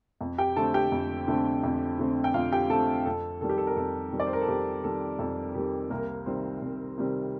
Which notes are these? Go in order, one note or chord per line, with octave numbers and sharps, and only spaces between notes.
F2
G4 G5
D3 A3 C4 A4 A5
G4 G5
F2
D3 A3 C4
F2
D3 A3 C4
G5
F2 F4 F5
G4 G5
D3 A3 C4 A4 A5
F2 A4
D#3 G3 A4
G4
A4
A#4
F2 A4
D#3 G3
D5
C5
A#4
A4
F2 G4
D#3 G3 A4
F2 A4
D#3 G3 G4
C2 A#3 A#4
C3 D#3 G3 C4
C2
C3 D#3 G3 C4